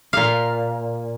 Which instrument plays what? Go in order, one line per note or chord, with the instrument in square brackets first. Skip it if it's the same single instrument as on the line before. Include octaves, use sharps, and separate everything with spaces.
[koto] A#2 F5